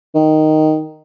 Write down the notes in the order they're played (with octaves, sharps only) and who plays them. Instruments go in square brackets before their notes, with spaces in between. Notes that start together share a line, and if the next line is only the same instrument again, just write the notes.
[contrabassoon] D#3